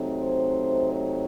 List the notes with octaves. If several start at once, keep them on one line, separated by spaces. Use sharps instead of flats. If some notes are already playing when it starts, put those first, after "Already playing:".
Already playing: C3 F#3 A3 C4 D#4
C5
C#5